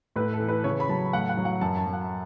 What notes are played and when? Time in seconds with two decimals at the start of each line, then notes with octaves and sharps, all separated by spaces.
0.16 A2 B4
0.33 A4
0.40 E3
0.49 B4
0.64 C#3 C#5
0.80 B5
0.89 F#3 A5
1.13 A2 F#5
1.29 F#5
1.37 F#3
1.45 F#5
1.61 F#2 A5
1.77 A5
1.86 F#3
1.93 F#5